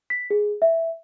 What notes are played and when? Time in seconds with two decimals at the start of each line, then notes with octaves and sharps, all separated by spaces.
0.10 B6
0.30 G#4
0.62 E5